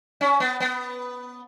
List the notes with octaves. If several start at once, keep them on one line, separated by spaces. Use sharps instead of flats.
C#4
B3
B3